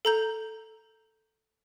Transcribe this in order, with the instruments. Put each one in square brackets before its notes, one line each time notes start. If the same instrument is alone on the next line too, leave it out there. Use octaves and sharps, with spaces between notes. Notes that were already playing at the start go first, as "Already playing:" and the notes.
[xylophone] A4 A#5 G6